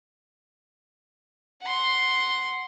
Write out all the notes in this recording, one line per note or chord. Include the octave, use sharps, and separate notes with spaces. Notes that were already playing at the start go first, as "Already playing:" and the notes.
F#5 C6